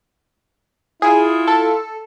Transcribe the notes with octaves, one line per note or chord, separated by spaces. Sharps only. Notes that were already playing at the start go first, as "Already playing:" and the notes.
E4 F4 G#4
A4